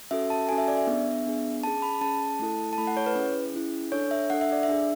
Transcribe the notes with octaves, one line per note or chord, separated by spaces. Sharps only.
C#4 F#4 A4 E5
A5
C#4 F#4 A4 G#5
E5
D5
E5
B3 D4 G#4
B3 D4 G#4
C#4 G#4 A5
B5
C#4 G#4 A5
A3 E4 A4
A5
A3 E4 A4 B5
F#5
C#5
B4
C#4 E4 G#4
C#4 E4 G#4
D4 A4 C#5
E5
D4 A4 F#5
E5
D5
E5
D4 G#4